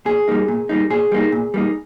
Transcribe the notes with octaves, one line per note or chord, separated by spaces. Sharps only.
A#2 G#4
G3 A#3 D#4
A#2
G3 A#3 D#4
A#2 G#4
G3 A#3 D#4
A#2
G3 A#3 D#4